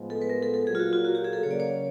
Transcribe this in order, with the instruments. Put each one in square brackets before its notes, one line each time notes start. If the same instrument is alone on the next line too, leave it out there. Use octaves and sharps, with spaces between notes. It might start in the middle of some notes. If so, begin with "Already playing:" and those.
Already playing: [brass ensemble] A2 F3 G#3 B3
[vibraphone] A4
B4
A#4
A4
A4
[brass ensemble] A#2 F#3 A#3 [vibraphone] G#4
[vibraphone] F4
F#4
F4
F#4
G4
G#4
A4
[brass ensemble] C#3 F#3 A#3 [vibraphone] C#5
[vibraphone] D5
C#5